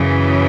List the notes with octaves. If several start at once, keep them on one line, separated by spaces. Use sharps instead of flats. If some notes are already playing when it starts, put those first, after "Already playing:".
Already playing: F#2 C#3 E3